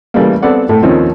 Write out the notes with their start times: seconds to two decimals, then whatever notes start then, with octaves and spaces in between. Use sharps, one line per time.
0.14 C#3 E3 G3 A3 A#3
0.42 B3 C4 A4 D5 F#5
0.69 A2 A3
0.82 D#2 F3 C4 C#4 D#4